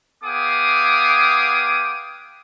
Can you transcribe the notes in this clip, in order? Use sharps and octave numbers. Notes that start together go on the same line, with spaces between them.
B3 G#4 F5 G5 D6 D#6